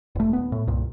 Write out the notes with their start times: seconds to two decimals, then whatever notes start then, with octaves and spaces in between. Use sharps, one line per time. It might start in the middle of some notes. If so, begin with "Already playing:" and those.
0.15 E1 A3
0.33 D#1 B3
0.52 A2
0.67 C2 G2 A#2